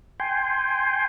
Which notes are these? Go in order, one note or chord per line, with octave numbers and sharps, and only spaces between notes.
G5 G#5 C6